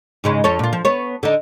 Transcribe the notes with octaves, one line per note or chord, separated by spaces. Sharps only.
G#2 C#3 G#3
F2 A4 C#5
A#2 F4
F3
B3 C#5
D3 D#4